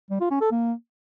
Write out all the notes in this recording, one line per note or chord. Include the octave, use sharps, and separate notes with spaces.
G3
F4
C#4
A4
A#3